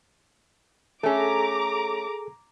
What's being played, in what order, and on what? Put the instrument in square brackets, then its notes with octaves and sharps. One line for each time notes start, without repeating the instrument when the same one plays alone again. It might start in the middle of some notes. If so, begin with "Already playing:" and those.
[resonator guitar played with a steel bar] A3 C#4 [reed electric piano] G#4 A4 [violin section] A#5 D6